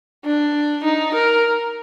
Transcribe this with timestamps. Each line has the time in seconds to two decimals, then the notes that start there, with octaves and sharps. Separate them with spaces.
0.25 D4
0.84 D#4
1.14 A#4